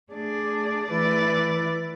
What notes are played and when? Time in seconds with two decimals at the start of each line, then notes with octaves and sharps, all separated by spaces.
0.12 A3 D4 G#4 D5
0.88 E3 A3 E4 B4 D5